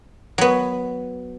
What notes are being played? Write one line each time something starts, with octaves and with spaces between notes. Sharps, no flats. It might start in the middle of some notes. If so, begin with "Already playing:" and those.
F#3 B3